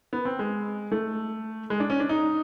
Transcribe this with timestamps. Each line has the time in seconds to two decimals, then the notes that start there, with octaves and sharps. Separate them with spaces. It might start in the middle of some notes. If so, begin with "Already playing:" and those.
0.13 B3
0.25 C4
0.39 G#3
0.92 A3
1.70 G#3
1.80 D4
1.90 C#4
2.00 D4
2.09 D#4